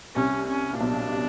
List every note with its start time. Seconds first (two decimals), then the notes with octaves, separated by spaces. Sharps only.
0.16 C2 C3 C#4
0.47 C#4
0.73 A#2
0.80 B1 B2 D4
1.11 C3